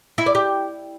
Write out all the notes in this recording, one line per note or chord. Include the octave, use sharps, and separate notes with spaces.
E4
D5
G4